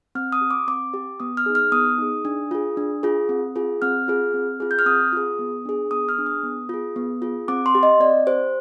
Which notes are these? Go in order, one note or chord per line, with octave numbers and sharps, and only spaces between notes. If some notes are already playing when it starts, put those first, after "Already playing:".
C4 F6
D#6
G4
D6
C4 D6
G4
B3 D#6
F6
D#4 G#4
F6
B3 D#6
D#4 G#4
D4
F4 G#4
D4
F4 G#4
C4
F4 G#4
C4 F6
F4 G#4
C4
F4 G#4
G6
F6
C4 D#6
F4 G#4
B3
D4 G#4
B3 D#6
F6
D4 G#4
D#6
B3
F4 G#4
B3
F4 G#4
C4 D6
C6
G4
D#5
C4 D5
G4 C5